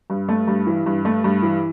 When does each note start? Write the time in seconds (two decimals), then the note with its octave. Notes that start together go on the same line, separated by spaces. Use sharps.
0.10 G2
0.29 A3
0.47 G2
0.67 E3
0.86 G2
1.05 A3
1.24 G2
1.43 E3